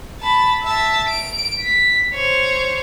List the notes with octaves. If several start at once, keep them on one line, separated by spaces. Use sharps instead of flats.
A5 B5
E5 A5
D7
B6
C5 C#5